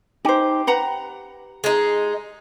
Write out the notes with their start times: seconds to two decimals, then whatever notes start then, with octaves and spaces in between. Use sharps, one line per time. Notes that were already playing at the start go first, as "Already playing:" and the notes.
0.25 D#4 G4 C5
0.67 B4 F#5 A#5
1.64 G#3 D#4